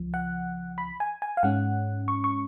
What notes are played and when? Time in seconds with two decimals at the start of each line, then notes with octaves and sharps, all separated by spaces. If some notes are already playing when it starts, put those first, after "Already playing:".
Already playing: C#2 F3
0.14 F#5
0.78 B5
1.00 G#5
1.22 G#5
1.37 F5
1.43 G#2 G#3 C#4 F#5
2.08 C#6
2.24 C#6